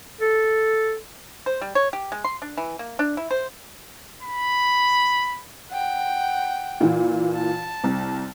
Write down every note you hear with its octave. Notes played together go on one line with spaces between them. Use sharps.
A4
C5
G3
C#5
G4
G#3
C6
D4
E3
A#3
D4
E4
C5
B5
F#5 G5
A#2 E3
A5
C2